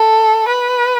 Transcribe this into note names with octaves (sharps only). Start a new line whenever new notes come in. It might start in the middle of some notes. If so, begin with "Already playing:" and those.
Already playing: A4
B4